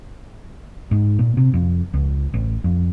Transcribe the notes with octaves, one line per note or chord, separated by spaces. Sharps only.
G#2
A#2
C3
F2
C#2
A1
F2